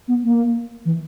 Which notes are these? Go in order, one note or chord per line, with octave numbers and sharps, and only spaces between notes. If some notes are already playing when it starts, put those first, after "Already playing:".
B3
A#3
E3